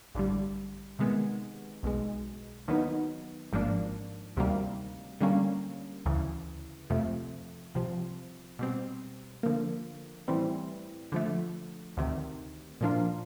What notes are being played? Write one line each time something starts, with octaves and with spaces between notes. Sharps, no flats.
A1 G2 D3 G3
C3 D#3 G#3 B3
B1 B2 G#3
D#2 D#3 F#3 B3 D#4
G#1 G#2 F3 A#3 D4
D2 C3 D#3 G3 A#3
D3 G3 A#3 C#4
D2 C#3 E3
F2 C3 F3 A3
C2 C3 F3
B2 G3 C4
D3 F3 A#3
A2 E3 G3 C4
D3 F3 A3
D2 C3 D#3
A#2 F3 A#3 D4 F4